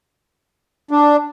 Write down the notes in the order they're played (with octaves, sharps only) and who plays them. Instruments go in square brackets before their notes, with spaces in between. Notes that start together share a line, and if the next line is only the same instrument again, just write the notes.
[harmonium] D4